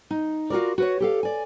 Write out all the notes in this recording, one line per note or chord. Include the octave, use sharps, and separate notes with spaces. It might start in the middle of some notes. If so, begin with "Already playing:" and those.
D#4
F4 F#4 A#4 D5
F#4 B4 C#5
G4 A4 F5
D5 G#5